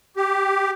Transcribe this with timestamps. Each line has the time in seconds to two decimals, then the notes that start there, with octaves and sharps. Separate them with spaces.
0.17 G4